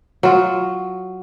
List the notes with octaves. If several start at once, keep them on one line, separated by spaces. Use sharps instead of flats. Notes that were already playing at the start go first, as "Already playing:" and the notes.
F#3 F4